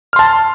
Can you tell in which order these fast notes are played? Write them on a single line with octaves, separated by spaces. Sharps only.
F6 C6 A5